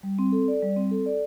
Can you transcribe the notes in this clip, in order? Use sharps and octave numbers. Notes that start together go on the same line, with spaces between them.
G3
C4
A4
D5
G3
C4
A4
D5